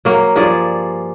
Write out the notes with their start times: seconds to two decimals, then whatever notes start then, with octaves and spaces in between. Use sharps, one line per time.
0.05 F#3 A#3
0.35 G2 F3 G#4 D5